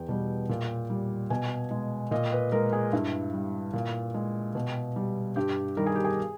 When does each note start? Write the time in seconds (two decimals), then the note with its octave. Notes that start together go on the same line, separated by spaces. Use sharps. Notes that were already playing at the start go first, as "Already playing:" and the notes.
Already playing: E2 G5
0.09 B2 G3
0.49 A#2
0.90 G3
1.30 B2 G#5
1.71 G#3
2.11 A#2 D#5
2.32 B4
2.52 G#3 A#4
2.73 G#4
2.93 G2 E4
3.34 G3
3.73 A#2
4.14 G#3
4.55 B2
4.96 G3
5.36 G2 G4
5.77 D#3 G3 A#4
5.86 G#4
5.96 G4
6.05 G#4